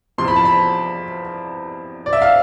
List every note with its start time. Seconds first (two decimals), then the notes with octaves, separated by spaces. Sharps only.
0.18 E2 C3 F3 C6
0.28 B5
0.36 A5
0.45 B5
2.06 D5
2.13 E5
2.22 F5